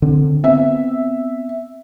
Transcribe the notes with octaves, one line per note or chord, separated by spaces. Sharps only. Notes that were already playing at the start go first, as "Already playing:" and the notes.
D3 C4
B3 C4 E5